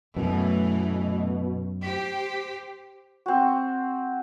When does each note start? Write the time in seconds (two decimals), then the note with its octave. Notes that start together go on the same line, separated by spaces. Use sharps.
0.16 F#2 B2 E3 A3
1.83 G4 C5 B6
3.26 C4 F#4